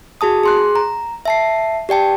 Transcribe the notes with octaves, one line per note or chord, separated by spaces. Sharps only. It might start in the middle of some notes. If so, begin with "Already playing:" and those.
F#4 G#4 A5 D#6
G#4 C6 F#6
A#5
E5 A5 C7
G4 D5 G5 A5